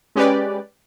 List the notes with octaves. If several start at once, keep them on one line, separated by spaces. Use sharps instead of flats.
G#3 C#4 G4 B4 D5